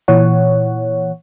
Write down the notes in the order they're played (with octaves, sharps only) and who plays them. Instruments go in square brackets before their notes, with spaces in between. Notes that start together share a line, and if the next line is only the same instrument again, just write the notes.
[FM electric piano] A#2 E3 C#5 F#5